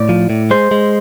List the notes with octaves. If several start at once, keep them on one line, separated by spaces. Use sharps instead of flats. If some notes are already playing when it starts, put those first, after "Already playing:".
Already playing: A2 D5
F3
A2
G#3 C5
G#3